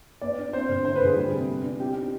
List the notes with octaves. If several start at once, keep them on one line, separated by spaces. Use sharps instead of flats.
B3 D5
D4
C4 C5
D3
D4 C5
B4
D3 G#4
G3
C3
B3
D4
C4 G4
D#4